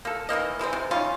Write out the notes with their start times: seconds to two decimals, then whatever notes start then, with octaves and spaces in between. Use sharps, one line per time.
0.05 A#3 A4
0.29 D#3 E3 A#3 D#5
0.59 E3 G#3 A3 C4
0.73 C3
0.91 G3 C#4 D#4 F4